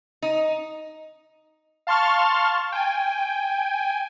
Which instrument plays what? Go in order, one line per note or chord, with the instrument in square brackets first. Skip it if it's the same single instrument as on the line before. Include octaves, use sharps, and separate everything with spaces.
[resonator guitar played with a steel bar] D#4
[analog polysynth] F5 A5 C6 C#6 F6 A6
G5 G#5